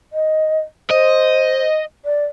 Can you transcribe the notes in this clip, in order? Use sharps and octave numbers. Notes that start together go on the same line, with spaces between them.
D#5
C5 D#5
D5